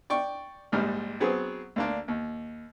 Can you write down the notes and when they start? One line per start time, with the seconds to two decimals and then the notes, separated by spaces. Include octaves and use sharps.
0.10 D5 G5 C#6
0.72 A#1 G#2 G3 F6
1.20 F#3 B3 C4 G#4
1.76 D2 A#3 D4
2.08 D#2